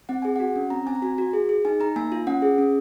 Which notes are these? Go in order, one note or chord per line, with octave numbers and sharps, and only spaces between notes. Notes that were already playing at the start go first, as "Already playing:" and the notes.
C4 F#5
G#4 G#5
F#4 F#5
C#4
C4 A#5
C4 G#5
A#5
F#4 G#5
F#4
G#4
G#4
D#4 G#5
D#4 A#5
A#3 G#5
F4
C#4 F#5
G#4
C#4